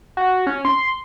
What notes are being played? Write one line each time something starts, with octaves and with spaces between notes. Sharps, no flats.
F#4
C#4
C6